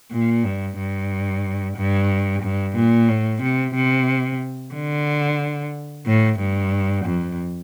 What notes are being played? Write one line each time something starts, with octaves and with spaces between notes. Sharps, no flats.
A#2
G2
G2
G2
G2
A#2
A2
C3
C3
D3
A2
G2
F2